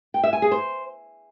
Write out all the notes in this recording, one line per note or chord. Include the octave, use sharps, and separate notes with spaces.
G5
E5
G#5
G#4
C5